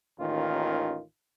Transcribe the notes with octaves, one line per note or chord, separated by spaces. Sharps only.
A1 D#2 D#3 C#4 F4